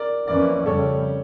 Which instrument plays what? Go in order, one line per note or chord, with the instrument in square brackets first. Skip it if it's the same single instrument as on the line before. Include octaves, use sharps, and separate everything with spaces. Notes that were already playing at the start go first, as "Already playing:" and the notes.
Already playing: [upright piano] A#4 D5
[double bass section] F2 E3 A#3 C#4 [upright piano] A#4 D5
[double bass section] F2 C#3 G3 [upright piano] A4 C#5